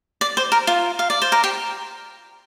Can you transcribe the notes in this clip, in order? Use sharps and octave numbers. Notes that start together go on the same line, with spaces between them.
D5
C5
A#4
F4
F5
D5
C5
A#4
G4